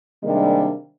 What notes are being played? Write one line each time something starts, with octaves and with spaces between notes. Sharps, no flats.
C3 D#3 G3 G#3 A#3 D4